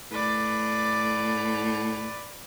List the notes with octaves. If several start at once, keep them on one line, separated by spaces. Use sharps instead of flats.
A2 B4 D5